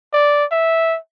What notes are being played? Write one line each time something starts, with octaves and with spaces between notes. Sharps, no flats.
D5
E5